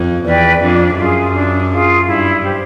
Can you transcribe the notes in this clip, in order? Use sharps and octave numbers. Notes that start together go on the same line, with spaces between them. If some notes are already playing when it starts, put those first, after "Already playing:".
Already playing: F2
E2 B4 D5 G5
F2 D4
F#2 F4 G#4
D4
F4 G#4
G2 E4
G4 C5